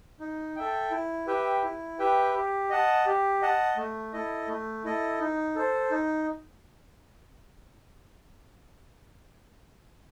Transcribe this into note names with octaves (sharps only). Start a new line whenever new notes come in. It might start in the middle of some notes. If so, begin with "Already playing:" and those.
D#4
A4 E5 G5
E4
G4 B4 E5 G5
E4
G4 B4 E5 G5
G4
D#5 F#5 A5
G4
D#5 F#5 A5
A3
E4 A4 D#5
A3
E4 A4 D#5
D#4
A4 C5
D#4